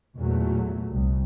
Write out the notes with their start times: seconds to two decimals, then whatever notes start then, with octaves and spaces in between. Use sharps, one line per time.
0.16 E2 A#2 F#3 A3
0.88 C2